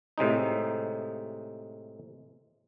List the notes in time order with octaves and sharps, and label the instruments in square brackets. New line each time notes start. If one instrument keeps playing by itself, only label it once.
[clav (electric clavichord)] A2 C3 G#3 D#4